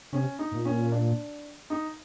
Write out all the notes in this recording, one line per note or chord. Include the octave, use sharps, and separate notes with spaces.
C3 C#4
D#4
A#2
C#4
D4
D#4